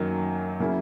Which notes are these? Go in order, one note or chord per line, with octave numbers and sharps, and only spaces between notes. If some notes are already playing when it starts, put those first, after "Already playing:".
Already playing: F#2 D#3 F#3 A#3
C#3 F#3 A#3 E4